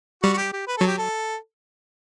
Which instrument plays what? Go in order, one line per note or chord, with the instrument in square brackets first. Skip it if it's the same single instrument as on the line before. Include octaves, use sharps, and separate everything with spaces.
[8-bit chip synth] G3 [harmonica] F#4
[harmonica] F#4
G4
G4
B4
[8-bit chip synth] F#3 [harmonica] A4
[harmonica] G4
A4